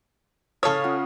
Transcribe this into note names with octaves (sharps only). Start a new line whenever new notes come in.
C#3 A4 C#5 F5 C#6 D#6 F6
C#4 F4 F#5